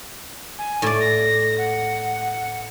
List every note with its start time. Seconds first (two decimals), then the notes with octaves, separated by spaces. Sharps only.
0.58 G#5
0.82 A2 D5
1.00 A#6
1.58 F#5